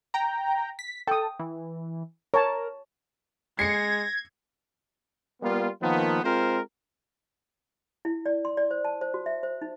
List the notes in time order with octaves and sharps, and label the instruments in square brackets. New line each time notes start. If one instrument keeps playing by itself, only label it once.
[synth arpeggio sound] G5 A#5
B6
[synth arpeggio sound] A4 [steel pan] G5 D#6
[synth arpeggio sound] E3
[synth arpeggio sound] A#4 [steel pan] C#5 A5
[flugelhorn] G#3 [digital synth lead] G#6 [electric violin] A#6 [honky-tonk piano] C7 C#7
[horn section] G3 A#3 B3 F4
D#3 F3 A#3 B3
G#3 C4 F4 A#4 C5
[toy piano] E4
D5
C6
D5
C5
A5
C5
F#4
E5
C5
D#4